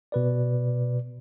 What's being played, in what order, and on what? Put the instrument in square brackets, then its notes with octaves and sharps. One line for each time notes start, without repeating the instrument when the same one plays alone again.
[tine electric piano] B2 B4 D5